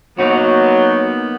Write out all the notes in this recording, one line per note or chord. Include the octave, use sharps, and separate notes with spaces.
F#3 A#3 B3 D#4 F#4